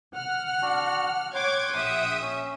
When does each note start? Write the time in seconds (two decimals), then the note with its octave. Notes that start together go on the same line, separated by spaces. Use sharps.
0.14 F#5 F6
0.62 D4 F#4
1.35 C#5 F#5 G5 C6 D6 G#6
1.74 A#1 E5 D#6
2.21 C#4